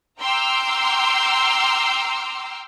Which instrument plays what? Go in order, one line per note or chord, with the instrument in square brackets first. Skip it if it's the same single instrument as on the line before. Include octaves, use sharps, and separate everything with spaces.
[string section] G5 A#5 C6 D6 E6 F6